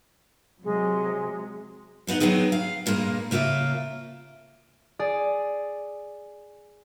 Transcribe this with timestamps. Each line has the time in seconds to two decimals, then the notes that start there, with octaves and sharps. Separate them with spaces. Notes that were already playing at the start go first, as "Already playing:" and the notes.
0.63 C3 F#3 G#3
2.07 G#2 B3 D#4 F#5
2.20 F#3 A3 B3 C4 D#4 G#4
2.52 F5
2.86 G2 A#2 G#3 A#3
3.31 C#3 A#3 F4 A4 E5
4.99 G#4 D5